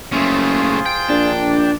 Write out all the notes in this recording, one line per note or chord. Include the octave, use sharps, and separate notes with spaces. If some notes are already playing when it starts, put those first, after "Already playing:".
F#1 C#3 A3 F4 G#4 C5
G5
A#1 D4